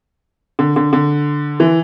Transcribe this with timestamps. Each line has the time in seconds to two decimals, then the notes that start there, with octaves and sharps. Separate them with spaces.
0.59 D3
0.76 D3
0.93 D3
1.60 E3